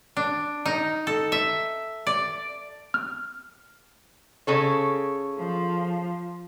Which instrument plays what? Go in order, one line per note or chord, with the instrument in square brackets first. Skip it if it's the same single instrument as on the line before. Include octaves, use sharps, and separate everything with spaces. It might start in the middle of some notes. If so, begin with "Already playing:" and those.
[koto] D4
D#4
A4
E5
D5
[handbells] F6
[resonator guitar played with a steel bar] C#3 A4 C#5
[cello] F3